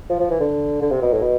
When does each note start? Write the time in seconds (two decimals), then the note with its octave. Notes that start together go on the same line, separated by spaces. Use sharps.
0.10 F3
0.20 F3
0.30 E3
0.40 D3
0.82 D3
0.91 C3
1.02 B2
1.12 A2
1.22 B2